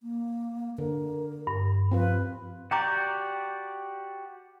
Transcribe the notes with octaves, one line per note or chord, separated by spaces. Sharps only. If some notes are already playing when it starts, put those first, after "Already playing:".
A#3
D3 A#4
G2
F3 C4 F4 B4
F#4 G4 D5 G5 A#5 D6